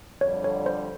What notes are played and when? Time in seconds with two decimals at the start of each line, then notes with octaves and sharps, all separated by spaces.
0.21 F2 D3 G3 C#5
0.44 C#5
0.66 C5